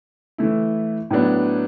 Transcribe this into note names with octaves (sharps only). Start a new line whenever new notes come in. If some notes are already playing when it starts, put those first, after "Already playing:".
E3 A3 E4
A2 F#3 B3 D4